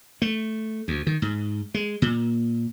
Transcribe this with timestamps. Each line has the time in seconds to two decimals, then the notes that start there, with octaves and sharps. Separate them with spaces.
0.22 A3
0.88 D2
1.07 D#3
1.22 G#2
1.74 G#3
2.02 A#2